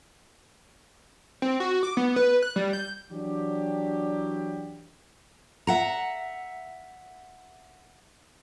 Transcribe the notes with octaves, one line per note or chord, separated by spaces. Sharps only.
C4
F#4
D6
B3
B4
F#6
G3
G6
E3 F#3 D4 G4
E5 F#5 A#5